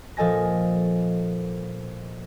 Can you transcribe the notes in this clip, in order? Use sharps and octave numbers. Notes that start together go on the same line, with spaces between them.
A#2 F3 A4 D#5 G#5 A#6